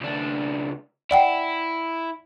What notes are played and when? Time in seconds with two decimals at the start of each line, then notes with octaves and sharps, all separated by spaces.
0.01 C#2 D4
1.11 E4 D5 F#5 G5